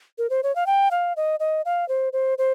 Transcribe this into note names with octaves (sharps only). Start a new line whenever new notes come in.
A#4
C5
C#5
F5
G5
F5
D#5
D#5
F5
C5
C5
C5